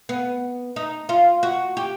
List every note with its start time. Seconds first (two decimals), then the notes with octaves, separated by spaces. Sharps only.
0.09 B3
0.76 D#4
1.09 F4
1.43 F#4
1.77 G4